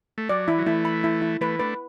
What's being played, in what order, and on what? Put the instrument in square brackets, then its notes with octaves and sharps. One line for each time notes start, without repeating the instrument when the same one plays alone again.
[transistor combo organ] A3
[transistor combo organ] F#3 [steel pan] D5
[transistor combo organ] E3 [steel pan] E4
[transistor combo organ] F#3
[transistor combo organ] E3 A3 [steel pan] E4
[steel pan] B5
E4
E4
[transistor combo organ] E3 A3 [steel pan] B4
[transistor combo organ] A3 D4 [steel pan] B4